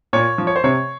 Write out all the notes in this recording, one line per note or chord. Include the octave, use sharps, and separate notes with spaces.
A#2 C#5
F3
C#5
C5
C3 C#5